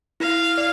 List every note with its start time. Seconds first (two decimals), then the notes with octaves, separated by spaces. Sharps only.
0.20 E4 F5
0.58 D5